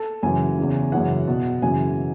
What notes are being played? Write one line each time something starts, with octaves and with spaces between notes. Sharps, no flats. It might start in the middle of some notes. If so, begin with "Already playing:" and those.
Already playing: A4
F#2 C#3 E3 G#5
E2 C#3 E3
F#2 C#3 E3 F#5
E2 B2
F#2 C#3 E3 G#5